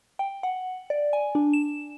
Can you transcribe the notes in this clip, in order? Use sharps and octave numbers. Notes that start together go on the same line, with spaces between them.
G5
F#5
D5
G#5
D4
E7